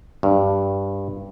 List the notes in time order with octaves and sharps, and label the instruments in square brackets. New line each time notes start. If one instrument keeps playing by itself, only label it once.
[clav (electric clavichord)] G2